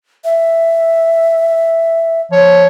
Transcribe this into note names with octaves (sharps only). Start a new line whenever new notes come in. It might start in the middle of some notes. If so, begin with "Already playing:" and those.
E5
F3 C#5